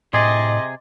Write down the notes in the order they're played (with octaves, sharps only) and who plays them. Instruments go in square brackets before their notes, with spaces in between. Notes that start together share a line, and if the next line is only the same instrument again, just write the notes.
[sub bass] A2 [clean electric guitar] C3 G#4 [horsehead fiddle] D#5 [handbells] C6 D6 A6